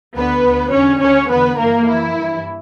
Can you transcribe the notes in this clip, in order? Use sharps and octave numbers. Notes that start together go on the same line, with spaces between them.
D2 D3 B3 B4
D2 D3
E2 D3 C#4 C#5
D2 D3 C#4 C#5
E2 D3 B3 B4
G2 E3 A#3 A#4
F#2 E3 E4
G2 E3